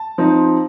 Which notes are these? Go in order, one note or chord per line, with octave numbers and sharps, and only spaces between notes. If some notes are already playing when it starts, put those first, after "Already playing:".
Already playing: A5
F3 C4 D#4